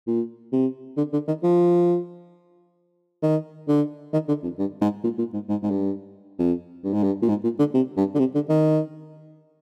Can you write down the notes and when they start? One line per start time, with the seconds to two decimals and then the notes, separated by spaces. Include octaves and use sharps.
0.07 A#2
0.53 C3
0.97 D3
1.13 D3
1.28 D#3
1.43 F3
3.23 D#3
3.68 D3
4.13 D#3
4.28 D3
4.43 F2
4.58 G2
4.81 G#2
5.04 A#2
5.18 A#2
5.34 G#2
5.49 G#2
5.63 G#2
5.71 G2
6.39 F2
6.84 G2
6.93 G#2
7.04 G2
7.22 A#2
7.29 G#2
7.44 A#2
7.59 D3
7.74 C3
7.97 G2
8.15 D3
8.19 C3
8.35 D3
8.49 D#3